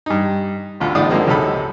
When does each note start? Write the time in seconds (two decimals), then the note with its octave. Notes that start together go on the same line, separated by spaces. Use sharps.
0.06 G2 D#4
0.80 A1 D2 F4
0.95 A#1 G#2 F4 D5 D#6
1.10 D3 F3 G#3 A#3 C4
1.27 C#2 F#2 C3 D#4 A4 B5